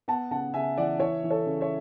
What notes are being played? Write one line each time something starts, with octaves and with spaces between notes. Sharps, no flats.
B3 F#5 A5
C#3 F#5 A5
C#3 E5 G#5
E3 D5 F#5
E3 C#5 E5
E3
A4 C#5
C#3
C#5 E5